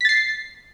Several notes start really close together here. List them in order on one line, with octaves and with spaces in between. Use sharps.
B6 A6 C7